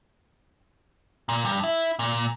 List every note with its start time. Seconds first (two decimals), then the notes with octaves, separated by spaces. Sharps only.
1.29 A#2
1.45 G2
1.64 E4
1.99 A#2